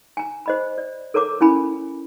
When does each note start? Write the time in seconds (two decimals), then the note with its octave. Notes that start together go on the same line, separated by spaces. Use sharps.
0.17 G#5 A#5
0.46 C5 D#5 B5
0.78 D5
1.14 A4 A#4 C#5 A#5 D6
1.40 C#4 E4 G#5 B5